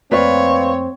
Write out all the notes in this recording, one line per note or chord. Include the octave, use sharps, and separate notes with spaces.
F2 A3 A#3 C4 B4 C#5 D5 F5